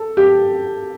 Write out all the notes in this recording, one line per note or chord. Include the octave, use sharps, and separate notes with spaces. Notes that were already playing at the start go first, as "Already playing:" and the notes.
Already playing: A4
G4